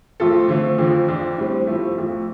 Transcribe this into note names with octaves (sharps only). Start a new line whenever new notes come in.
F2 F3 A3 F4 A4
D3 F3 A3 C4
F2 D3 F3
F2 F3 D4 F4
A2 G3 C4
A2 F3 A3
F2 F3 A3